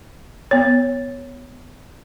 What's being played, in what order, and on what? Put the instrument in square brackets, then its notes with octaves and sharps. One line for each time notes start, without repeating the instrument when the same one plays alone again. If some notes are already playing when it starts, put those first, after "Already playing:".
[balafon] B3 C#5